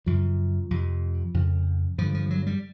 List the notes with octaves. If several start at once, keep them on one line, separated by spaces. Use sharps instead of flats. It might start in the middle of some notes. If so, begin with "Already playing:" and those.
F#2 C#3 F3
F2 C3
F2 C#3
G2 D3 F3
F3
F#3
G3